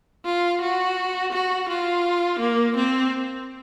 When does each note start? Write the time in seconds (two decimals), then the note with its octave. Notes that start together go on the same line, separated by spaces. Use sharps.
0.25 F4
0.61 F#4
1.32 F#4
1.69 F4
2.39 A#3
2.76 C4